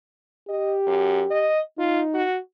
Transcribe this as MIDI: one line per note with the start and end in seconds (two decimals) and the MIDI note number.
0.49 1.49 67
0.49 0.75 75
0.87 1.24 42
1.30 1.60 75
1.78 2.24 63
1.78 2.01 65
2.14 2.39 66